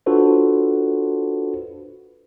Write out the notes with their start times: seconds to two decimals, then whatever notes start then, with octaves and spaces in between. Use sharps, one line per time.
0.06 D4 F4 F#4 A4 B4 C5